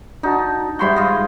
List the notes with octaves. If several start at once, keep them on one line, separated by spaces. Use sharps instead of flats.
D4 D#4 F#4 A5
G#2 G3 E4 F#4 C6 G6
F4 D#5